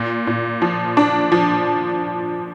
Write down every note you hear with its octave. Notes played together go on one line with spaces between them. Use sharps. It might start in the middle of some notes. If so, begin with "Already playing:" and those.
Already playing: A#2
A#2
F3
D4
F3